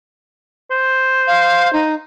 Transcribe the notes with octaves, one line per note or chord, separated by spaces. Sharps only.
C5
F5
D#4